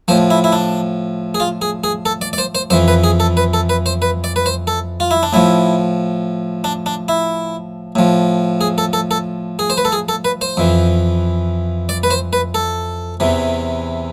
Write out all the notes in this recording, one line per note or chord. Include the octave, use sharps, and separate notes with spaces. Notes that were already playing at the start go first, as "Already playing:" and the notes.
A2 F3 C5
E4
E4
D4
G#4
F4
G#4
G#4
A4
D5
D5
C5
C5
F2 E3 C5
B4
G#4
A4
B4
A4
B4
C5
B4
D5
B4
C5
A4
F4
E4
D4
A2 F3 E4
D4
D4
E4
A2 F3
G#4
A4
A4
A4
G#4
C5
B4
A4
G#4
A4
B4
C5
F2 E3
D5
B4
C5
B4
A4
E2 C3 E3